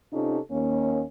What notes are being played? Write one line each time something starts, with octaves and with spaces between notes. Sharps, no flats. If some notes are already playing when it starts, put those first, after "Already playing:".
C3 C#4 D#4 F4 G4 A4
D#2 A#3 C#4